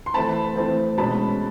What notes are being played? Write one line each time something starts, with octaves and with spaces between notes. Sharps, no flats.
C6
E3 A3 C4 A5 B5
E3 A3 C4
B2 G#3 C#4 A5 B5